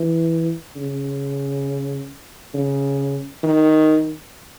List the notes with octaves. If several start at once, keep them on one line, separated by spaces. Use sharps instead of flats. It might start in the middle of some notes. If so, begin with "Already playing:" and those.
Already playing: E3
C#3
C#3
D#3